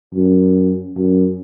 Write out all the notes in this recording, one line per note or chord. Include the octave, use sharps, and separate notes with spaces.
F#2
F#2